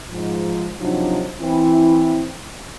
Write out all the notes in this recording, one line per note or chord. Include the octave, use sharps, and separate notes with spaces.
G#2 F3
C3 F3 F#3 D4 D#4
E3 C4 E4